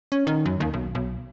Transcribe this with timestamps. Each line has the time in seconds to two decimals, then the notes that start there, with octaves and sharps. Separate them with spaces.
0.12 C#4
0.27 D#3
0.45 F#2
0.60 D#2
0.74 B1
0.95 B1